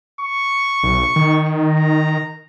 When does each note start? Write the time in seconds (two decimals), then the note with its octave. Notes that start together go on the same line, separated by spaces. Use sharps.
0.21 C#6
0.83 B1
1.16 D#3
1.68 A#5